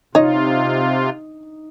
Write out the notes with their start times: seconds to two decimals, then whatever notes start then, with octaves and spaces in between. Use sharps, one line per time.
0.15 C3 D#4 F4 C#5 D#5